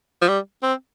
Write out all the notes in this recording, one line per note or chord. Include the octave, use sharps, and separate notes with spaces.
F3
G3
C4